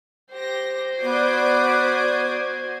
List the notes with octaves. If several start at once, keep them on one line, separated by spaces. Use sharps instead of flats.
G4 C5 A#6
B3 F#4 D5 D6 D#6 G#6